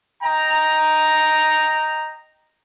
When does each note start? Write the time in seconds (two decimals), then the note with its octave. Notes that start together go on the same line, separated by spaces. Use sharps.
0.22 D#5 G5 A#5